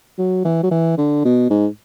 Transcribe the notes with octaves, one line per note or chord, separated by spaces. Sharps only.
F#3
E3
F#3
E3
D3
B2
G#2